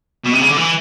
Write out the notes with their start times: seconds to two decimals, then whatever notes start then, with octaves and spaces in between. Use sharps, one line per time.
0.24 B2
0.33 C3
0.41 C#3
0.49 D3
0.57 E3